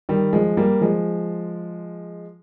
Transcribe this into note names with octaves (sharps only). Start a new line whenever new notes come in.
D#3 G3
F3 G#3
G3 A#3
F3 G#3